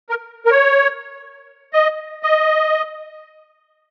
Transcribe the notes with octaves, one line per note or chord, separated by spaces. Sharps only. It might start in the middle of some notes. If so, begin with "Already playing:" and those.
A#4
A#4
C#5
D#5
D#5